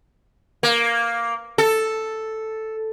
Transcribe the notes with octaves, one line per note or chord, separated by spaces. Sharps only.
A#3
A4